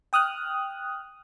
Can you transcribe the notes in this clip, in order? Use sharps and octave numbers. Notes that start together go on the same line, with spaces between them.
G5 D#6 F6 F#6